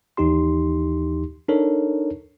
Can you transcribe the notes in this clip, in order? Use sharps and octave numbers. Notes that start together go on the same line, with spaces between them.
D#2 E3 D#4 G4 C6
D4 D#4 A4 A#4 C#5